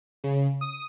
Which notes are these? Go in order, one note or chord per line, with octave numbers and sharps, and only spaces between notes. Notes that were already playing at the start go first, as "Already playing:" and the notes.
C#3
D#6